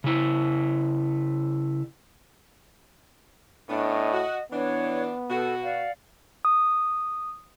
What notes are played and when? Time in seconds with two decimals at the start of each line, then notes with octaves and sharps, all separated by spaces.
0.04 C#3 E4
3.70 A2 B3 C#4 D4 D#5
4.13 F#4
4.52 E3 B3 D4 C#5
5.29 B2 F#4 A4
5.63 D5 F5 F#5
6.45 D#6